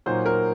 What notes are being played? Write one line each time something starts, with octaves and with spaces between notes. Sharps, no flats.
A#2 F#3 A#3 D#4 C5
A#4